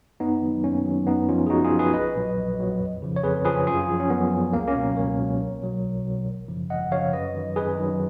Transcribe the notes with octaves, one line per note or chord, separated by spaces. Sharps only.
F#2 B3 D#4
D#3 F#3
F#2 A#3 C#4
D#3 F#3
F#2 B3 D#4
F3 C#4 F4
G#4
F#2 D#4 F#4
F4 G#4
F3
G#4 B4
A#1 B4 D#5
A#2 F#3
A#1
A#2 F#3
F2
C#3 F3
C#5
F2 G#4 B4
C#3 F3 G#4 B4
F#2 F4 G#4
F3
C#4
F#2 B3
F3
C#2 A#3
A#3 C#4
B2 F#3
C#2 A#4 C#5
B2 F#3
B1
B2 F#3
B1
B2 F#3
G#1
F#2 C#3 F3
G#1 D#5 F#5
F#2 C#3 F3 C#5 F5
F#2 B4 D#5
D#3 F#3
F#2 G#4 B4
D#3 F#3